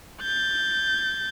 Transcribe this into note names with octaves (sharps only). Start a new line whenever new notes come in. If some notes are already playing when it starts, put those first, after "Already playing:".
G6 A6